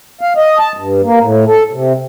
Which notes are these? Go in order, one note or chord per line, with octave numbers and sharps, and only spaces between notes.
F5
D#5
A5
G2
A#3
A2
A4
C3